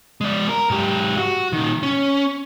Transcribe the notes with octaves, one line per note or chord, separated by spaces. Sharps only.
G#3 D5
A#4
G#2 G4
F#4
A#2 D#3
C#4